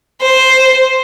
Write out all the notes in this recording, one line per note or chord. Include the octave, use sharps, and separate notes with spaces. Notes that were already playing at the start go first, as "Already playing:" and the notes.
C5